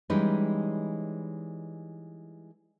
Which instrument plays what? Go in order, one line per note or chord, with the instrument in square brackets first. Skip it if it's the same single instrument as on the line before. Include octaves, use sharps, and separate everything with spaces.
[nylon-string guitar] E3 G3 G#3 C#4 D#4 B4